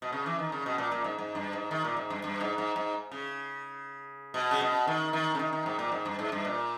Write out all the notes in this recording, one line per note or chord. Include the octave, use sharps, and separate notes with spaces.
B2
C#3
E3
D#3
C#3
B2
A#2
A#2
G#2
G#2
G2
G#2
D#3
A#2
G#2
G2
G2
G#2
G#2
G#2
C#3
B2
C#3
B2
D#3
D#3
C#3
D#3
D#3
G#2
A#2
G#2
G2
G#2
G2
A#2